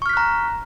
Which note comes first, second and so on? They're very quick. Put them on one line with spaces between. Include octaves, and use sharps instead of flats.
C#6 F6 B6 F#6 A#5